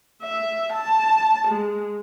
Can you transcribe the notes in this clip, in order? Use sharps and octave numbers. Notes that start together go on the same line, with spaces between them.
E5
A5
G#3